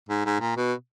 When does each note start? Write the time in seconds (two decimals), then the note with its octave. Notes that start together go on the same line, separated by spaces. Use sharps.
0.09 G#2
0.26 G#2
0.40 A#2
0.57 B2